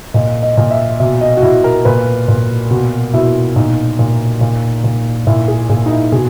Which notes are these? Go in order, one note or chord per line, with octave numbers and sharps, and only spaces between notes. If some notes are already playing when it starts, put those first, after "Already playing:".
A#2 D#5
D#5
A#2
E5
B2 E5
D#5
F#4
B2 E4
A#4
A#2 B4
A#2
B2 F#4
B2 E4
A#2 D#4
A#2
A#2
A#2
A#2 E4
G#4
A#2 G#4
D#4
E4
B2 G#4